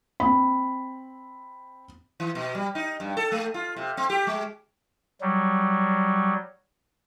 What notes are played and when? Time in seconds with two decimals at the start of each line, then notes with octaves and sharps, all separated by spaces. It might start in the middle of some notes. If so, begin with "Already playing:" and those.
0.20 C4 B5
2.20 E3
2.35 B2
2.55 G3
2.75 D#4
3.00 G2
3.17 A4
3.32 A3
3.54 F4
3.76 C3
3.97 C4
4.10 G4
4.27 G#3
5.21 F#3 G3